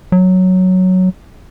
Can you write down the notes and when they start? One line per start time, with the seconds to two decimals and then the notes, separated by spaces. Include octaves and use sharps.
0.12 F#3